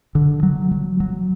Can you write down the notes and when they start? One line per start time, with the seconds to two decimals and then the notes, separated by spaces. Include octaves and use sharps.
0.15 D3
0.43 F#3
0.71 F#3
1.00 F#3